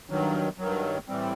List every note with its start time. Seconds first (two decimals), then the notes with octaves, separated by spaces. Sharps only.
0.10 G2 D#3 F#3
0.59 G2 D#3 F#3
1.08 A2 E3 G3 C4